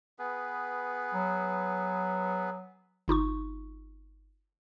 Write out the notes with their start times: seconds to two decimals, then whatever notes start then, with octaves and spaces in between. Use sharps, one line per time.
0.19 B3 G#4 B4
1.14 F#3
3.08 G1 D#4 F4 C#6